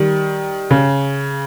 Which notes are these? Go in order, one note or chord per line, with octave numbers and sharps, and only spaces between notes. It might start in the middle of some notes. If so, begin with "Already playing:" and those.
Already playing: D#3 G3
C#3